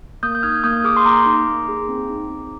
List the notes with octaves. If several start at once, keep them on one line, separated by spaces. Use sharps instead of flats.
A#3 D#6 G6
G6
D#4 F6 G#6
A#3 D#6 G6
G#4 D6 F6
C6
A#3 A#5 D6
D#4
A#3
G#4
C4
D#4
C4